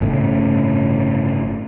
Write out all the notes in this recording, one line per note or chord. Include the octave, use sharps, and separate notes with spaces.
G1 A2 C#3